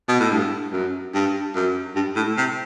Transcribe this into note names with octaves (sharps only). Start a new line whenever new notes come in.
B2
A2
G2
F#2
G2
F#2
G2
A2
C3